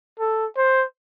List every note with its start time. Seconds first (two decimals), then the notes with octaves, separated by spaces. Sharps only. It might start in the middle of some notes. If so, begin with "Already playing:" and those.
0.19 A4
0.58 C5